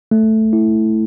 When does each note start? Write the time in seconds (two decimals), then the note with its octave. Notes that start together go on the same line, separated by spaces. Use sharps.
0.11 A3
0.53 E4